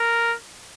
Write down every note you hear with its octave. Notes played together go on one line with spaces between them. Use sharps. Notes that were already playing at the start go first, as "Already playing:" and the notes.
Already playing: A#4